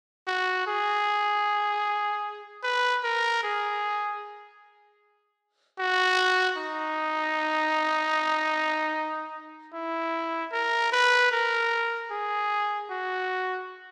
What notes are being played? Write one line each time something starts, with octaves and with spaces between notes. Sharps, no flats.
F#4
G#4
B4
A#4
G#4
F#4
D#4
E4
A#4
B4
A#4
G#4
F#4